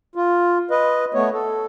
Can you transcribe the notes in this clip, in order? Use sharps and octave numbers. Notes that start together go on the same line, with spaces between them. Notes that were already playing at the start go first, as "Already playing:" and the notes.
F4
B4 D#5
A3 B3 C#5
A4